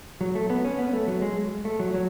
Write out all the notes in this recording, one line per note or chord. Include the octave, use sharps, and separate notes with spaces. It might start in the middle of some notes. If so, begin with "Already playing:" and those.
F#3
A3
B3
C#4
B3
A3
F#3
G#3
A3
F#3
F#3